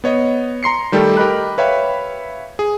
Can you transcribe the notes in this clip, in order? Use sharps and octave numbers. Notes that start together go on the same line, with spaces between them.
B3 C#5 D#5
A#5 C6 C7 C#7
D#3 G3 A3 G4 A4
G4 A#4 D#5 B5 F#6
B4 C#5 E5 F5 G5 B5
G#4